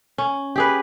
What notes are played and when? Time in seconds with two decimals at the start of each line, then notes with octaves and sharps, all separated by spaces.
0.18 C#4
0.56 G4 G#4 B4